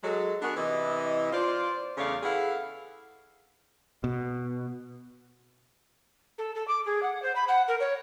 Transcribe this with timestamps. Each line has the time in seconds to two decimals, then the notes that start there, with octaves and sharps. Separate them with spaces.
0.03 F#3 G#3 A4
0.42 B3 D4 F#4 G#4 A#4
0.56 C3 E3 E4 D5 D#5
1.33 F4 C5 D5
1.98 E2 C#3 A3 C#5 D5 F5
2.23 E4 G#4 A4 B4 F5 F#5
4.04 B2
6.38 A4
6.55 A4
6.67 D6
6.85 G#4
7.02 F#5
7.22 C5
7.35 B5
7.48 F#5
7.67 A#4
7.79 C#5